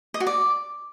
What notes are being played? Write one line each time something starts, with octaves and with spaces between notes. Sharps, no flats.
D#5
F#4
D5